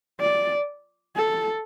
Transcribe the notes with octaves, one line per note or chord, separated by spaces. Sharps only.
D5
A4